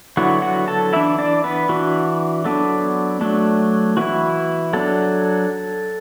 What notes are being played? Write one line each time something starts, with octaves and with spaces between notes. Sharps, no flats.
D3 F#3 B3 E4 F#4 F#5
F#4 F#5
A4 A5
E3 D4 E4 E5
D4 D5
B3 B4
E3 D4 F#4
F#3 B3 D4 A4
F#3 A3 D4
E3 B3 E4 F#4
F#3 D4 A4